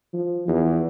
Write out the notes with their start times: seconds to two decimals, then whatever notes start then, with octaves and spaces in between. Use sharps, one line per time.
0.13 F3
0.48 E2